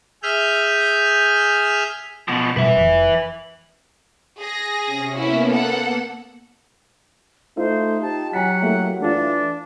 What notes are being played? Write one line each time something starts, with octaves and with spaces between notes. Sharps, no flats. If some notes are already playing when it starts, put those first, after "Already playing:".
G#4 E5 F6 G6
B2 F3
B2 G3 B4 E5
F1 F2 E3
G#4 A#6
C3 C#4
A#3 B3 C#4 E4 F#4
A4 F#5
A3 D#4 F4 C5
G4 A5
F#3 F#5 G#5 A#5 B6
A3 A#3 E4
E3 A3 D4 F4